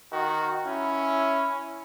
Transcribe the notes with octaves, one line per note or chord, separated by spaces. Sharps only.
D#3 F#4
C#4 E4